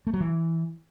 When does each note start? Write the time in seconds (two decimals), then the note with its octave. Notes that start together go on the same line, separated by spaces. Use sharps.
0.07 A3
0.14 F#3
0.20 E3